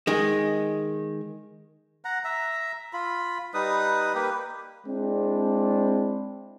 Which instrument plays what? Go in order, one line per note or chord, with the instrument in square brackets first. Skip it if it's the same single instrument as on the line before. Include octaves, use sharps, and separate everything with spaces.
[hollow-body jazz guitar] D#3 G#3
[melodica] F#5 A#5
E5 A#5
F4 B5
G3 D#4 B4 D#6
A#3 G4 B4
[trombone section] G#3 C4 D4 E4